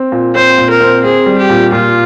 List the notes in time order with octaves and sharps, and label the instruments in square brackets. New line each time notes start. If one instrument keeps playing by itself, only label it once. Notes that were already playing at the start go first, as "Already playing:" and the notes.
Already playing: [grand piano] C4
A#2
[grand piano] C4 [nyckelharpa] C5
[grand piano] A#2
[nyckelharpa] A#4
[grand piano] C4
[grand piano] C4 [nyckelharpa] G#4
[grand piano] G3
[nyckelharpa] G4
[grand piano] A#2
[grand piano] A#2 [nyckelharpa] F4